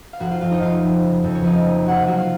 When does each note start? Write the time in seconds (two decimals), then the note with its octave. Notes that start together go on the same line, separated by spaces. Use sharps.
0.13 F5
0.20 F1 F#4 F#5
0.31 F4 F5
0.41 F2 F4 F5
0.51 D#4 D#5
0.61 F1 F4 F5
0.83 F1
1.03 C#3
1.24 F2
1.35 C#5
1.43 F2 D#4 D#5
1.66 A#3
1.85 C3 F#4 F#5
1.96 F4 F5
2.07 F#3 F#4 F#5
2.17 F4 F5